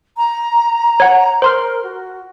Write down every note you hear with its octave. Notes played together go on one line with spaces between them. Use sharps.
A#5
C#5 F#5
A#4 C5 C6 F6
F#4